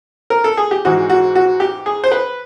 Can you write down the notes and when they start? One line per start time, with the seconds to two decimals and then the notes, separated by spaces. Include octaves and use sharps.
0.30 A#4
0.44 A4
0.57 G#4
0.71 G4
0.85 G#2 E3 G#3 F#4
1.10 F#4
1.35 F#4
1.60 G4
1.86 G#4
2.04 C5
2.12 B4